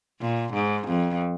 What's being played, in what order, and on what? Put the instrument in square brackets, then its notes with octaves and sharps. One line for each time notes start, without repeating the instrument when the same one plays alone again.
[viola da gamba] A#2
G#2
F2